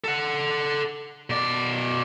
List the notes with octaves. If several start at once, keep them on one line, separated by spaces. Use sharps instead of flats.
A4 F#5
B2 D5